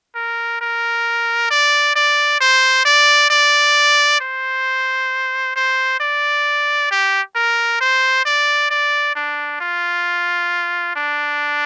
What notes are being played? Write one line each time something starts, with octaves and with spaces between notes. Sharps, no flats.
A#4
A#4
D5
D5
C5
D5
D5
C5
C5
D5
G4
A#4
C5
D5
D5
D4
F4
D4